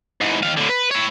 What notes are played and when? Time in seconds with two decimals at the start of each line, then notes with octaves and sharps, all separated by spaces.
0.21 G#2 E3
0.43 D#3 F5
0.57 A2 D3
0.70 B4
0.91 E4 C#5